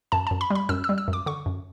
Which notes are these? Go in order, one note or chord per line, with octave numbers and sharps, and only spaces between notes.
F#2 A5
F#2 A5
B5
G3
B5
F#2 E6
E6
G3
E6
F#2
D6
D3 C#6
F#2